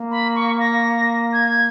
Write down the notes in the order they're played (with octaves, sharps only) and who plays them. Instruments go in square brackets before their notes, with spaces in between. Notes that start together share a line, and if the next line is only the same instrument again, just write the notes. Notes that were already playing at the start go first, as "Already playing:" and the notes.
Already playing: [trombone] A#3
[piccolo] B5
C#6
A#6
G#6